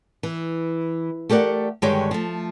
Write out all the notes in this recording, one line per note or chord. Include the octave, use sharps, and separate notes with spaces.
E3
A3 G4 A#4 D5 F#5
G2 D3 D#3 G#3 G4 C#5
F3 A3